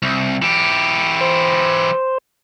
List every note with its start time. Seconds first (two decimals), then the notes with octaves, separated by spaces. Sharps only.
0.02 C2
0.42 E3 G4
1.21 C5